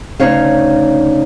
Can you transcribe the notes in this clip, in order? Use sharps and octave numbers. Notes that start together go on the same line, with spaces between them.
D2 G2 C#3 D#4 C#5 F5